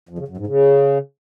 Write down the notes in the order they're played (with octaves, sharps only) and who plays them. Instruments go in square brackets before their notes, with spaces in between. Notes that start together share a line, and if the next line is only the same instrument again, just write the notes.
[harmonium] F2
C#3
F#2
G#2
C#3